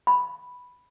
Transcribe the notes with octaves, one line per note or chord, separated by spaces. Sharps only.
B5